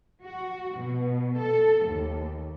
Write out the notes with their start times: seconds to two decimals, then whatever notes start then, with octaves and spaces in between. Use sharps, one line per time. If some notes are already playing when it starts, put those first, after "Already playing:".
0.22 F#4
0.77 B2
1.38 A4
1.85 D#2